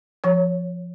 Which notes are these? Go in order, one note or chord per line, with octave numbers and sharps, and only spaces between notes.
F3 C#5